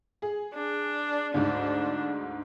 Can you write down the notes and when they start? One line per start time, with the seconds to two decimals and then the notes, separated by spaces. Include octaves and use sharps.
0.22 G#4
0.53 D4
1.34 D2 G#2 D4